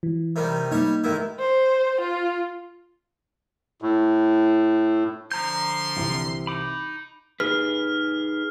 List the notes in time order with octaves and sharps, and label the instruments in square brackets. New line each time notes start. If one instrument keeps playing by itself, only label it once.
[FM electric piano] E3
[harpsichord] C3 D#3 G3
[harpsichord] G3 C#5 [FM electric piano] A#3 D#4
[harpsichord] A1 D#3 E4
[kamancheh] C5
F4
[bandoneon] A2
[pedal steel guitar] D3 A#5 G6 [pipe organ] F3 [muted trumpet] C6
[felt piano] C2 C3 E3
[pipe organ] D#4 [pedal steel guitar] B5 D6
[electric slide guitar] D#4 G#4 B4 [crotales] F6